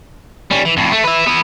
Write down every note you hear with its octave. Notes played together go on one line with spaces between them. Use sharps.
G3 C#4
E3
F2 A2
A3
B4 E5
B3 E4